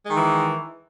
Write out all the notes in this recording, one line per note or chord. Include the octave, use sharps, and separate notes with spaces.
D#3 E3 G#3